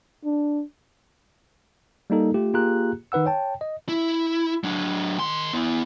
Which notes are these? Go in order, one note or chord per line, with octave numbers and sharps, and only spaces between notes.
D4
G3 A#3 D#4 A4
A3 F4 G4
A#3 F4 G4 G#4 A#5 F#6
D#3 D#4 B4 F#5 E6
C#5 G5 A5
D#5
E4
F#3 D4
D#3 C6
B3 E4